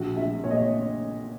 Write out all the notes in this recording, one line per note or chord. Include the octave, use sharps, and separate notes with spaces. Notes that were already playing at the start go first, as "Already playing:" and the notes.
Already playing: A#1 F#4
A#1 E5
A#2 C#5
D#5
C#5